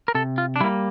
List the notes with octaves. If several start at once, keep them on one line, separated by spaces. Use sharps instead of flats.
A#4
C3 A4
F4
D4
G3 A#3 E4